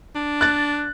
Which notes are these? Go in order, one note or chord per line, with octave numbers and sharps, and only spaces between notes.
D4
F#6 A6